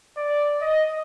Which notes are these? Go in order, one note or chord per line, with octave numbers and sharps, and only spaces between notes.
D5
D#5